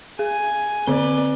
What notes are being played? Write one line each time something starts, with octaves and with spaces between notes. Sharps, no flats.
G#4 G#5
D3 C4 B4 D5 G7